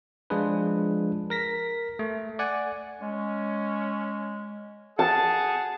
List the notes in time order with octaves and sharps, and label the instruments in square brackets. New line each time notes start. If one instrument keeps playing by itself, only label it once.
[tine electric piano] F3 G#3 D4 F4 G#4 B4
A#4 A#6 B6
A3
D5 F#5 G#5
[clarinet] G#3 [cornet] C#4
[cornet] G#4 [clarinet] F#5 [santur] A5